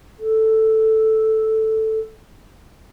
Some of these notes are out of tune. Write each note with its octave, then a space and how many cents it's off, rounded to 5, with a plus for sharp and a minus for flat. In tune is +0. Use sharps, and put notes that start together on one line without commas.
A4 +0